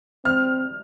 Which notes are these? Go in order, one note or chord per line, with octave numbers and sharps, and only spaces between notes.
C4 F6